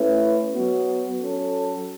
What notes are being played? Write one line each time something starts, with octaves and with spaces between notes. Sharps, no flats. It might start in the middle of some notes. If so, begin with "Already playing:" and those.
Already playing: A3 C#4 E4 B4
F#3 B3 F#4
F#3 C#4 A4